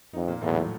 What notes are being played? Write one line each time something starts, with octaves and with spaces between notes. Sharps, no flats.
F2 D#3 D#4
A#2 A#3
E2 A2 A3
F#3
F3